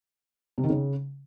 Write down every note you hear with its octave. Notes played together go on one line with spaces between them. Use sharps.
C3
D#3
C#3